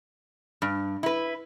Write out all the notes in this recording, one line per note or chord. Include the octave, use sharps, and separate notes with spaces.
G2
E4 B4